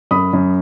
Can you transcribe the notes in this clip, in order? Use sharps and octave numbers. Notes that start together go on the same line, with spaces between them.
F#2 B5 D#6
F#2